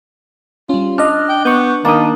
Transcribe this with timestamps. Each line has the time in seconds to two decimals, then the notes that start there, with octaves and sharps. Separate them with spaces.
0.69 G3 C#4 F4
0.98 D4 D#5 F6
1.29 G5
1.45 B3 C#6 G6
1.85 D#3 A#3 D4 A5 D#6